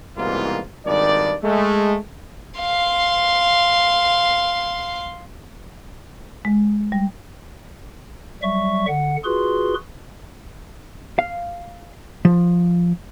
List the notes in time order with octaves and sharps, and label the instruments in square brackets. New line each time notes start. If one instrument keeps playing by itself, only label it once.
[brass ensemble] C2 G#2 B2 E3 A#3 F4
G#1 G2 D#3 D5
G#3 A3
[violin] F5 C6
[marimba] G#3
G3
[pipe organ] F#3 G3 E5 C#6
D3 F#5
F4 F#4 G#4 B4 C6
[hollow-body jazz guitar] F5
F3